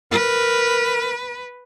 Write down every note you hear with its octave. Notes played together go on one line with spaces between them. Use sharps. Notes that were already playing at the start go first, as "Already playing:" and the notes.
A#4 B4